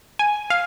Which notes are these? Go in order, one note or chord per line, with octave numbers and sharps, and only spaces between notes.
G#5
F5